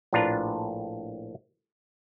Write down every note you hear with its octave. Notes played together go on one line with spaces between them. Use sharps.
A#1 A2 D4 F4 B4 A#5